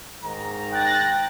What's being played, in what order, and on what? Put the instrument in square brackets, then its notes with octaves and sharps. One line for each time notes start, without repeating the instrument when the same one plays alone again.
[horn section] G#2 D#3 A#5
[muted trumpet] G5 [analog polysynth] F#6 A6 A#6